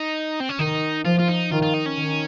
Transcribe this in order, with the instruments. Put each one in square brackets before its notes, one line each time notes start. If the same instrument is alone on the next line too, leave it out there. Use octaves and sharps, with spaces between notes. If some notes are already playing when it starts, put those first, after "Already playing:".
Already playing: [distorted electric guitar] D#4
C4
C#4
[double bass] D#3 [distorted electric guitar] D#4
[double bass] F3 [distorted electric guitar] F4
[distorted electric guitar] F4
D#4
[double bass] D#3 [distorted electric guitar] F4
[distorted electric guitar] F4
D#4
C#4
[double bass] D#3